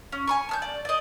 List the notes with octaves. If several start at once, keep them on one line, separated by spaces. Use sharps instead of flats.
C#4
G#5 B5 C#6
A5 F6 G6
D5
D5 D#5